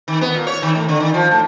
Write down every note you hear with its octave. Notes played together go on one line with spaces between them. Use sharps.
D#3
B3
A#2
C#5
D#3
A2
D3
D#3
F3
A2